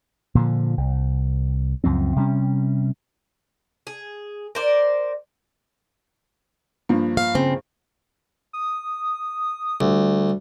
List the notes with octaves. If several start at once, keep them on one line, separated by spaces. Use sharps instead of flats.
A#2 D3 E3 F3
C2
C#2 F#2 F3 C4
C3 G3 A3 C#4
G#4
A#4 C5 D5
G2 F3 A#3
F5
C#3 C4
D#6
D2 G3